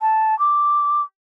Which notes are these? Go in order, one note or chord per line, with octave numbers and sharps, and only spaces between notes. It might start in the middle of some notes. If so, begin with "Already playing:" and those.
A5
D6